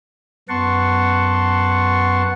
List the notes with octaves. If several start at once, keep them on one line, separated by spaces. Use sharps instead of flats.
F#2 B3 F#5 A5 C6 C#6